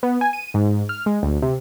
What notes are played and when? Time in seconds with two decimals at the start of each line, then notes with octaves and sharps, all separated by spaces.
0.03 B3
0.21 G#5
0.33 D#7
0.54 G#2
0.89 F6
1.06 G#3
1.23 D2
1.42 C3